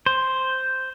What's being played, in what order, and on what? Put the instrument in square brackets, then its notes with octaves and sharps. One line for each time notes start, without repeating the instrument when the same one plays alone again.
[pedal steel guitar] C5